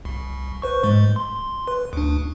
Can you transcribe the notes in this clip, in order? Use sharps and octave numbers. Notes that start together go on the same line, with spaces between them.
C2
B4 C5 C#6
G#2 G#3
C6
B4
D2 D4